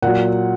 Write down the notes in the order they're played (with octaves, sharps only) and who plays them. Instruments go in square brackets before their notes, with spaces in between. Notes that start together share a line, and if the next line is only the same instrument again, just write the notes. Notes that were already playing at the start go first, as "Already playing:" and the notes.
[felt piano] A#2 F#3 F#5